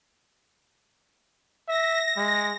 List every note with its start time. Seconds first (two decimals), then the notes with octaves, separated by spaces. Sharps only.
1.68 E5 A#6
2.17 G#3